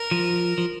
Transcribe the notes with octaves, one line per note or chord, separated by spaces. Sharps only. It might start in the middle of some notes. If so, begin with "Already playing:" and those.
Already playing: A#4
F3
F3